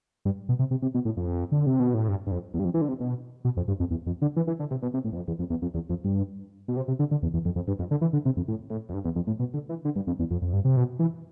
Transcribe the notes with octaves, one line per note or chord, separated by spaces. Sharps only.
G2
B2
C3
C3
C3
B2
A2
F2
D3
C3
B2
A2
G2
G2
F2
E2
G2
F2
E3
D3
C3
B2
B2
F2
G2
F2
E2
F2
D3
E3
E3
D3
C3
B2
C3
A2
E2
F2
E2
F2
E2
F2
E2
F2
G2
B2
C3
C3
D3
D3
E2
E2
F2
F2
G2
F2
D3
E3
D3
C3
F2
A2
A2
F2
G2
E2
F2
A2
B2
D3
E3
D3
G2
F2
E2
F2
F2
G2
C3
B2
E3